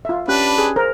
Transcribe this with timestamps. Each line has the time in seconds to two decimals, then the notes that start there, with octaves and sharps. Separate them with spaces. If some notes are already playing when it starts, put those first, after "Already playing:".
0.05 F4 E5
0.28 C#4 D4 G4 B4 F#6
0.58 G#4
0.76 A#4 C5